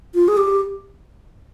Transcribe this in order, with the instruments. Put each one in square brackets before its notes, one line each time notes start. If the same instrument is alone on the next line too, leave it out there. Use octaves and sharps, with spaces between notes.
[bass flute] F4
G#4
G4